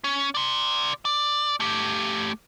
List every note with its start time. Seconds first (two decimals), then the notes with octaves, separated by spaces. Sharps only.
0.04 C#4
0.35 D5 C6
1.05 D5
1.60 A3 G4